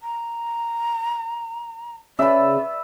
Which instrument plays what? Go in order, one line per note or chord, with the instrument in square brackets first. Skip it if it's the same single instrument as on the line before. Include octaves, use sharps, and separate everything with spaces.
[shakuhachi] A#5
[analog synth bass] C#3 [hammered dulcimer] B4 E5 [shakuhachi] D5